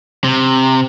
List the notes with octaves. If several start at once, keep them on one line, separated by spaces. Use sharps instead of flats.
C3